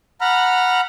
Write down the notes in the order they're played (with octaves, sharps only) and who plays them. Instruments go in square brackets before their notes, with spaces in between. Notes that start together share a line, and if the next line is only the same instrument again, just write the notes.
[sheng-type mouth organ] F#5 A#5 B5 F6